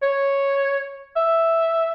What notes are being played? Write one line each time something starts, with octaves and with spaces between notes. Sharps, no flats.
C#5
E5